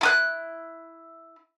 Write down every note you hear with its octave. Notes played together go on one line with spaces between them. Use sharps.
E4 D#6 F#6